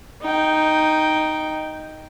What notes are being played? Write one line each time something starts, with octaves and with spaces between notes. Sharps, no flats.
D#4 G5